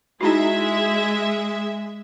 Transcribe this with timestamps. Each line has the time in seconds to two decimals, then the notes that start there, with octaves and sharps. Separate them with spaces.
0.21 G#3 D#4 E4 F#4 E5